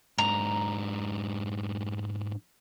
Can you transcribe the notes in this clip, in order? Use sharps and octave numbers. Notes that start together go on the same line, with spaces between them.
G#2 D4 A#5